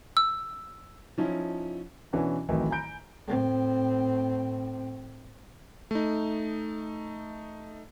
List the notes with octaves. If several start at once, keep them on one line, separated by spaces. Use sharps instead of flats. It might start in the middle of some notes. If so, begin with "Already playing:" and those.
E6
F3 C#4 D#4 E4
B2 E3 C#4 D4 F#4
A1 A2 C3 D#3 E3 F#3
G#5 A#5 B5 G6 D7
A2 C4
A3 D#4